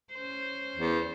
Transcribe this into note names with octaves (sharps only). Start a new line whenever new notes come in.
C#4 C5
E2